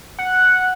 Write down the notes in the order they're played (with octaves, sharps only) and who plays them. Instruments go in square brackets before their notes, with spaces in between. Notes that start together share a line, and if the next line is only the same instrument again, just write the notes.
[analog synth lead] F#5